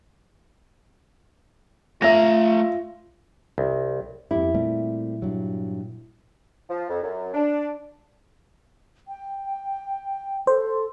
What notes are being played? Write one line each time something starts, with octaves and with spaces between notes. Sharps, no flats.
A3 F4 E5 A#5 A#6
C2
F2 E4 G4
A#2 G3 A3 C4
G2 F#3
F3
F2
F#2
D4
G5
A4 C5